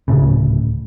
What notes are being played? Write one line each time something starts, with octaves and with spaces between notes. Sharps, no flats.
D1 A#1 A2 C#3